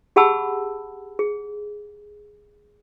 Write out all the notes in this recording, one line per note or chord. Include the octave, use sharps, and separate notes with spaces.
G4 G#4 F#5 A5 B5 E6
G#4